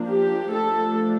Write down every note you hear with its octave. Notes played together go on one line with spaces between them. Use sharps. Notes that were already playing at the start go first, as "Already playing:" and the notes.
Already playing: F3 A#3 D4
G4
F3 A3 D4 A4